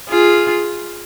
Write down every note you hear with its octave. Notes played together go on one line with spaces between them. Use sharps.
F4 G#4